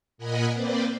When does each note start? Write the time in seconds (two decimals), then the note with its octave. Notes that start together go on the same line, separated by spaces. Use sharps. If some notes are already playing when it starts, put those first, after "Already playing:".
0.18 A#2 A#4 D#5 F#5 G#5 B5
0.51 A#3 C4 B4 C5 D5